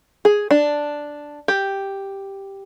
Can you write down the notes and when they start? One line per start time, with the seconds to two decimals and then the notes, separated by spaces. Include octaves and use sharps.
0.25 G#4
0.51 D4
1.48 G4